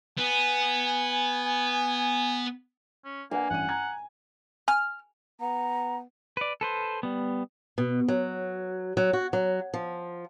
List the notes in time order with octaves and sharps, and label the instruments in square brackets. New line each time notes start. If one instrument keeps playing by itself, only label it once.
[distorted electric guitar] B3 [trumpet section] G#5
[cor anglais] C#4
[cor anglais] A#3 [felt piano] D4 B4 F#5 [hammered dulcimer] G#5
[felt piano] A1 G2 D#7 [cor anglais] F#5
[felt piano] A#5 G#6
[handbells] G#5 [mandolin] F6
[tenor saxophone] B3 [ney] A#5
[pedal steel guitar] B4 D5
A4 B4 C5
G3 B3
[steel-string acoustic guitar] B2
F#3
F#3
F#4
F#3
F3